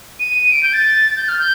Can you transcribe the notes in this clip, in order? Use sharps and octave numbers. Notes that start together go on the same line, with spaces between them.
D#7
D7
G6
A6
G6
F6
G6